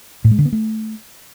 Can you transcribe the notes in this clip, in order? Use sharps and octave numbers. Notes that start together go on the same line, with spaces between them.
A2
G#3
D3
B3
A3